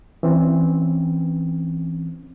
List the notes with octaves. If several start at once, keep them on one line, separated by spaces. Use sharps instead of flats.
E3 C4 C#4